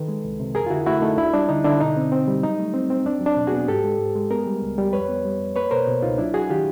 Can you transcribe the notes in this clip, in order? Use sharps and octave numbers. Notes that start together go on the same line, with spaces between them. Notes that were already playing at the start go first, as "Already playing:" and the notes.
Already playing: D#3 A4 B4
G#3
C2
C3
F2 G#4 A#4
F4
D3 E4 F#4
A3 E4 F#4
A3 D#4
D2 D4 E4
G3 D4
D3 D#4
D3 D4 E4
B2 D#4
C4
C4
G3
F#3 D#4
A3
C4
C4
E2 D4
F#3
D4
B2
F#4 G#4
B3
G#2 G4 A4
G#3
G#2
G#3
B3 G#4 A#4
G3
C#2
G3
F2 B4 C#5
B3
G3
F2
A#3 B4 C#5
B2 A#4 C5
B2
C#2 D#4 F4
F#3 D4 E4
F#3 F#4 G#4
D#3 F4 G4